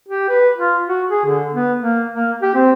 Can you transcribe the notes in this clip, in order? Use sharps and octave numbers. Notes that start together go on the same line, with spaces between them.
G4
B4
F4
F#4
G#4
D3
B3
A#3
A#3
G4
C4